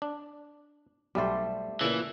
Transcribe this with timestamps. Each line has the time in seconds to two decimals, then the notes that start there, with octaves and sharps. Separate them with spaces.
0.02 D4
1.15 B1 G3 A3 C5 D5
1.81 A#2 C#3 E3